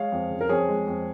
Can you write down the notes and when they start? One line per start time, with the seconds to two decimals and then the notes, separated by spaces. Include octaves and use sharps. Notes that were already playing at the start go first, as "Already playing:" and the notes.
Already playing: G#3 C#5 F5
0.12 F2
0.30 C#3
0.41 A#4
0.49 F2 G#4 C#5
0.69 G#3
0.87 F2